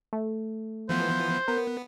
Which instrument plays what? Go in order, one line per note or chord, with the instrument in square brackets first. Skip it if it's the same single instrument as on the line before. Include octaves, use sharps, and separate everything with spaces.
[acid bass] A3
[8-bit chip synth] E3 F3 B3 [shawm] C5
[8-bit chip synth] B3 [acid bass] A#4